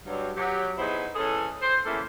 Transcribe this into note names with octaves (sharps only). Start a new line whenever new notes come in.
G2 F#3
F#3 G4
B3 D#4 E4 G#4 C5
E3 C#4 G#4 A4
C5
E2 E3 A#3 C#4 E4 A4